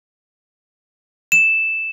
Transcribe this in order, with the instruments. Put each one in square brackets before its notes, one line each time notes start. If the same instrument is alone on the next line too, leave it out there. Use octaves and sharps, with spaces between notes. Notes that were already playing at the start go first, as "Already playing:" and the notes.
[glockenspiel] E7